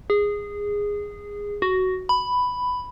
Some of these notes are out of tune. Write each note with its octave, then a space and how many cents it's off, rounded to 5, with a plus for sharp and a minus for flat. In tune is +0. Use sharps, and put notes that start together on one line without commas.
G#4 -15
F#4 +10
B5 +5